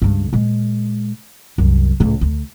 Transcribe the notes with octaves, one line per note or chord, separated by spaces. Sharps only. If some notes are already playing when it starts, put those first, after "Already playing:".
C#2 G2
A#2 G#3
C2 F#2
C#2 A2
D2